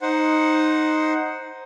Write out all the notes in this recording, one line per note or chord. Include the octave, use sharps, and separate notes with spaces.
D#4 C5 F#5